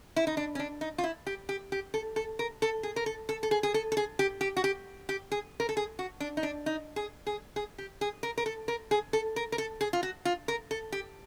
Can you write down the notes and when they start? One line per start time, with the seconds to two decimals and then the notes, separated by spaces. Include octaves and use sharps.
0.16 E4
0.27 D#4
0.37 D4
0.55 C#4
0.59 D4
0.81 D#4
0.98 F4
1.04 E4
1.27 G4
1.49 G4
1.72 G4
1.94 A4
2.16 A4
2.39 A#4
2.62 A4
2.83 G#4
2.96 A#4
3.06 A4
3.29 A4
3.43 A4
3.51 G#4
3.63 G#4
3.74 A4
3.92 A4
3.97 G#4
4.19 G4
4.41 G4
4.57 F#4
4.64 G4
5.09 G4
5.32 G#4
5.60 A#4
5.69 A4
5.77 G#4
5.99 F#4
6.20 D4
6.37 D#4
6.43 D4
6.66 D#4
6.96 G#4
7.27 G#4
7.56 G#4
7.78 G4
8.01 G#4
8.23 A#4
8.38 A#4
8.46 A4
8.68 A#4
8.91 G#4
9.13 A4
9.36 A#4
9.52 A#4
9.58 A4
9.81 G#4
9.93 F4
10.03 F#4
10.25 F4
10.48 A#4
10.71 A4
10.92 G4